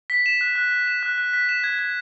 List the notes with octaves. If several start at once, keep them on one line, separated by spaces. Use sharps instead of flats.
B6
E7
F#6
F#6
B6
E7
F#6
F#6
B6
E7
G#6
G#6